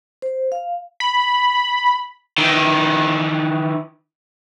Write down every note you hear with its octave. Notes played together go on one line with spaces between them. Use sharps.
C5
F5
B5
D#3 E3